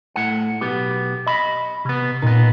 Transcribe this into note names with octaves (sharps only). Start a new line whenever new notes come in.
A2 F#5
B1 B3 G4
D#5 B5
C3 B3
A#2 B3 D#4